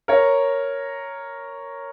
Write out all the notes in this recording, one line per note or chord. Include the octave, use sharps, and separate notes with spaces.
A#4 C#5